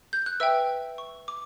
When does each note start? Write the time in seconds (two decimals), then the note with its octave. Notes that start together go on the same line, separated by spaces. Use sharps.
0.13 G6
0.26 F#6
0.40 B4 E5 G5 E6
0.98 C#6
1.28 D6